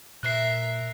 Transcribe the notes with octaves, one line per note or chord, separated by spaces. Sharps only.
A#2 A#4 E5 F#6 C7